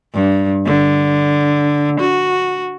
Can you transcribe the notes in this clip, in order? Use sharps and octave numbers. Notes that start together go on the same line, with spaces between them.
G2
D3
F#4